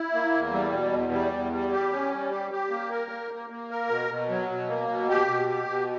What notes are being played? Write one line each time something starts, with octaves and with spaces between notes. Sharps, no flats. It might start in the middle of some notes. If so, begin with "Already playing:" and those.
Already playing: E4
A#3
E2
G3
B2
E2
G3
E2
G3
G4
C#4
G3
G4
G4
A#3
A#4
A#3
A#3
A#3
A#4
B2
B2
F#3
B2
A#3
B2
G4
B2
G4
B2